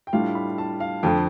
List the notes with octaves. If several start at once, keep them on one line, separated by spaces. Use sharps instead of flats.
G5
A2 G3 D4 F4 F5
B5
A5
F5
F2 D3 F3 G5